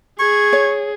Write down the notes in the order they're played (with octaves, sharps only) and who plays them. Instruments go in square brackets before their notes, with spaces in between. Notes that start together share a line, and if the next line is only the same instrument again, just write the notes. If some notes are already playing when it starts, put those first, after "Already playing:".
[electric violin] G#4 [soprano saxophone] C#6 [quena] G#6
[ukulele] C#5